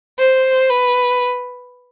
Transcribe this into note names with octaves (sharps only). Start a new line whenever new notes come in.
C5
B4